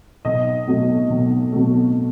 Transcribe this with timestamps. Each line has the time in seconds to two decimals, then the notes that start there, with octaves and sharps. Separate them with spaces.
0.25 B1 D#5
0.67 B2 F#3 A3
1.10 B1
1.52 B2 F#3 A3